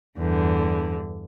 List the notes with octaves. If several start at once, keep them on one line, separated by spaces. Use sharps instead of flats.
E2 G2 D3